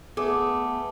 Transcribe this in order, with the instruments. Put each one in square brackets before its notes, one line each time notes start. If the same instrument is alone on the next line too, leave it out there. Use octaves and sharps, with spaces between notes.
[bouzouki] A3 [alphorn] B3 [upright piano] G#4 [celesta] D6